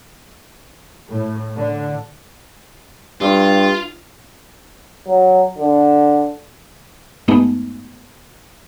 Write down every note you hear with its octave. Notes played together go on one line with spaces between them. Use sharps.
A2
D3
G2 F4
F#3
D3
G2 G#3 A3 B3 D#4